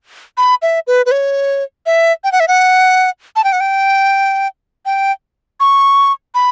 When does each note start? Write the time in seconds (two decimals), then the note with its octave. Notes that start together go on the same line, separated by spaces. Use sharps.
0.37 B5
0.62 E5
0.87 B4
1.06 B4
1.11 C#5
1.86 E5
2.24 G5
2.32 F#5
2.40 E5
2.48 F#5
3.36 A5
3.44 G5
3.53 F#5
3.60 G5
4.86 G5
5.60 C#6
6.35 B5